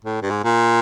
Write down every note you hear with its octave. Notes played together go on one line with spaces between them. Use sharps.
A2
G2
G#2
A#2